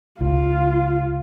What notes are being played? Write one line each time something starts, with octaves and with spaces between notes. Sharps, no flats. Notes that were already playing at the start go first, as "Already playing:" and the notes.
C#2 F4